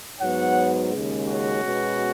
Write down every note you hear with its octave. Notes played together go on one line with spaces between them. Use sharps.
G#2 F#3 B3 C#5 F#5
D#2 C#3 G#3
C#4 F#4
B2 G#3 B3